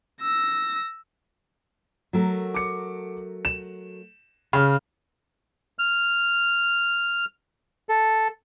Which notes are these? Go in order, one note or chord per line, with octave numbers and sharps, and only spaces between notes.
E6 A#6
F#3 A3 A#4
D6 C#7
E7
C#3 F6
F6
A4